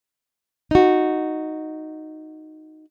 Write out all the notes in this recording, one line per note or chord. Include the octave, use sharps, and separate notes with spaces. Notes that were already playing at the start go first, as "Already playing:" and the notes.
D#4 F#4